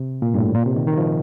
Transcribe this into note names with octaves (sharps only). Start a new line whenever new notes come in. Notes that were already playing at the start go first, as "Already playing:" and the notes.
Already playing: C3
A#2
G2
A2
A#2
C3
D#3
D#3
F3